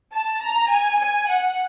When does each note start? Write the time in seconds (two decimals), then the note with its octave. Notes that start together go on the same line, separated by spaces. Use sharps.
0.13 A5
0.42 A#5
0.70 G#5
1.00 G#5
1.29 F#5